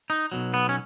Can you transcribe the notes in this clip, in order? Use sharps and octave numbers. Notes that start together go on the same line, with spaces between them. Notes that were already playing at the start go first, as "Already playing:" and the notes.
D#4
B1 B2 F#3
B3
C#4